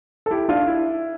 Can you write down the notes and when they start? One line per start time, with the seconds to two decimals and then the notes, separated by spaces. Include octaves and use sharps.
0.26 A4
0.31 E4 G4
0.48 D4 F4
0.67 E4